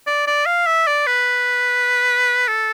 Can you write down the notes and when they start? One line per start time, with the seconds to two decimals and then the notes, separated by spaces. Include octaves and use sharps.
0.07 D5
0.27 D5
0.46 F5
0.66 E5
0.87 D5
1.07 B4
2.48 A4